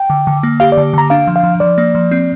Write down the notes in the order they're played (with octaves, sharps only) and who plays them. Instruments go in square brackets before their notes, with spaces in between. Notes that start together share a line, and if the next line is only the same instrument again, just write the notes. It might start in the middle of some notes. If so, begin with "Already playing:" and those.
Already playing: [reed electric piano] G5
[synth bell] D3
D3
A#3
[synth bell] G4 [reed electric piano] F5
[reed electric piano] D5
[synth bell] D3
[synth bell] D3 [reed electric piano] A#5
[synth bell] D4 [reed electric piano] F5
[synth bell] F3
[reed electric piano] F5
[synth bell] F3
[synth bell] F3 [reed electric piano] D5
[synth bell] A#3
F3
C4